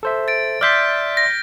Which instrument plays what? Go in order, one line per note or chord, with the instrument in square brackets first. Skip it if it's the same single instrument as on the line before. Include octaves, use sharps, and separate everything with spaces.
[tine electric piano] A4 C5 E5
[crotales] A6 D7
[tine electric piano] D5 E5 C6 [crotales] F6 G6 B6
[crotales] A#6